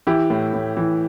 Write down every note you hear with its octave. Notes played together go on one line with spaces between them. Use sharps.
E3 E4 G4
A2
A2
E3